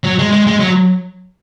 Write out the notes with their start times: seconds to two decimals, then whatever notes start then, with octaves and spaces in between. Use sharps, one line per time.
0.04 F#3
0.19 G#3
0.32 G#3
0.47 G#3
0.59 F#3